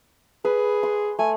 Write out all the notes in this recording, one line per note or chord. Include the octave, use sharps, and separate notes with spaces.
G#4 B4
C6
A3 G#5